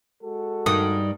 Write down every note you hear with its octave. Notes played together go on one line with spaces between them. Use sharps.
G#3 F#4 A4
G2 D#3 D#6